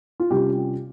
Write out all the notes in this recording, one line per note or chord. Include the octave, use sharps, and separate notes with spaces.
F4
C3 G3 C#4 F4 G4